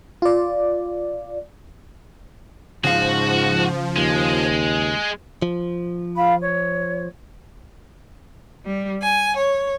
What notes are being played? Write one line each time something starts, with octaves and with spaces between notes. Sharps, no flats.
F4 D5
G#2 C#3 F3 F#4 F5
D#2 G#3
F3
F4 F5 B5
C#5
G3
G#5
C#5